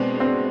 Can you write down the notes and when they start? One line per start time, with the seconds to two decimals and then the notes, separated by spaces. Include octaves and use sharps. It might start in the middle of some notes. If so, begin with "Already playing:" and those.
Already playing: B2 G#3 B3 C4 D4
0.20 C4